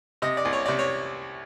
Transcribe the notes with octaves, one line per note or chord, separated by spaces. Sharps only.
C3 D#5
D5
C2
C#5
C3 D5
C#5